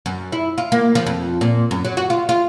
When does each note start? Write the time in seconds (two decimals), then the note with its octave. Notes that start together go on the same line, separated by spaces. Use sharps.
0.06 F#2
0.32 E4
0.58 F4
0.72 A#3
0.95 F3
1.07 F2
1.41 A#2
1.71 F#2
1.85 F#3
1.97 F#4
2.10 F4
2.29 F4